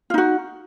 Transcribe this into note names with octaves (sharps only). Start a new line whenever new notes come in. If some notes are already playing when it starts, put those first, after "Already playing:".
D#4 F4 F#4